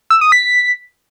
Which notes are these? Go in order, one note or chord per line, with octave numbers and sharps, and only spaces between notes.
E6
D#6
B6